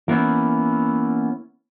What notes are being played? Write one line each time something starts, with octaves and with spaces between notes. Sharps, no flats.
E3 A#3 B3 C#4 E4